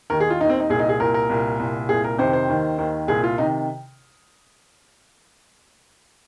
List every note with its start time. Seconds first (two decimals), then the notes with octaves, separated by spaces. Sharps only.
0.10 D#2 D#3 A#4
0.20 G#4
0.30 F4
0.40 D#3 D#4
0.44 D#2
0.49 C4
0.60 D#4
0.69 C2 A#2 G#4
0.79 D#4
0.89 G#4
1.00 C2 A#2 A#4
1.14 A#4
1.29 C2 A#2
1.59 C2 A#2
1.89 C2 A#2 G#4
2.04 A#4
2.18 F2 C3 D#3 C5
2.33 C5
2.49 D#2 D#3
2.78 D#2 D#3
3.08 C2 A#2 G#4
3.24 F4
3.38 C3 D#3 D#4